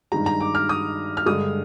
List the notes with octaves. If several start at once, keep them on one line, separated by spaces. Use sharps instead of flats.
G2 D#3 G#3 A#5
A#5
D6
F6
D#6
F6
G2 D3 G#3 D#6